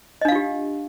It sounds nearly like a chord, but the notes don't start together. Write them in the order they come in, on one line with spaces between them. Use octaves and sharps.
D#5 D4 F5 F4 G4